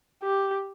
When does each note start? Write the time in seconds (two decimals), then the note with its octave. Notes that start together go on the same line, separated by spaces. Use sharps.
0.23 G4